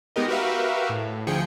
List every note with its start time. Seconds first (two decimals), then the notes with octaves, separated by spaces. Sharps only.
0.16 G#3 B3 D#4 G4 A#4 D#5
0.28 F#4 G4 A#4 B4 E5 F5
0.89 A2
1.27 D2 F3 G#4 G5 C#7